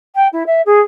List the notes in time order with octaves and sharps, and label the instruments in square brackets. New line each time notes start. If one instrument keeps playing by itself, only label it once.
[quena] G5
E4
E5
G#4